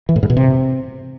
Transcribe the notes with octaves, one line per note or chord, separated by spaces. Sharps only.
E3
A2
G#2
B2
C3